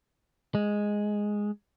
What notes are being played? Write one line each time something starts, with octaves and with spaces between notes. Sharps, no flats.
G#3